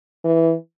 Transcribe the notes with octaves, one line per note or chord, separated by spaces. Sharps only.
E3